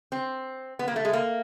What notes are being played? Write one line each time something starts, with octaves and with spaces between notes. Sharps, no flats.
C4
B3
A#3
A3
G#3
A#3